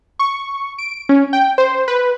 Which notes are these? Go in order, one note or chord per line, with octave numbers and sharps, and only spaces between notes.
C#6
D7
C#4
G5
C5
B4